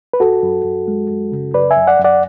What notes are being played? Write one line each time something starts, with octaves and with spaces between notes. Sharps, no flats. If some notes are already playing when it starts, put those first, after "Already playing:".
B4
F#2 F#4 A4
F#2
F#2
G#3
F#2
C#3
F#2 B4 D5
E5 G#5
F#2
D5 F#5
F#2
D5 F#5